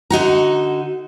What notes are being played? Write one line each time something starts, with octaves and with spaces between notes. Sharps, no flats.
D3 D#4 F#4 A#5